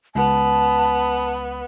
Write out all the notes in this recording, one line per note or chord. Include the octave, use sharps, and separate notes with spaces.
C#2 B3 A5